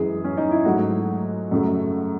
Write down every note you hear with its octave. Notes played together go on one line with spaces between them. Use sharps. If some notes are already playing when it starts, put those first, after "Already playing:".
Already playing: F#2 E3 G#3 G#4
C#4
D#4
E4
G#2 F#3 A3 F#4
F#2 C#3 F#3 A3